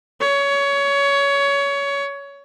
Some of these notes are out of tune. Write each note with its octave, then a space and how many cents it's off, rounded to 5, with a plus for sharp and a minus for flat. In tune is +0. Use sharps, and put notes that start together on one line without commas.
C#5 +20